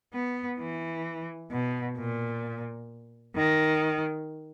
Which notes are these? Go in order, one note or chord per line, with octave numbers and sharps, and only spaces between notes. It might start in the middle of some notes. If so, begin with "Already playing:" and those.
B3
E3
B2
A#2
D#3